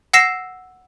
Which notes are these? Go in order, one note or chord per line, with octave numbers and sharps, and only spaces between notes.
F#5 E6 A#6 C7 E7